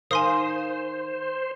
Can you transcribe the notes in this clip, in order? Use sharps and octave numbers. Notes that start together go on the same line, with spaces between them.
D#3 A#4 C5 F5 G#5 C6 D#6